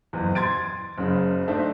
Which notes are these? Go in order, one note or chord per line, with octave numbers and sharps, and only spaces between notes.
F#1 E2
C6 G#6 A6 D7
F#1 F#2 C#3
A3 D4 D#4 C5 E5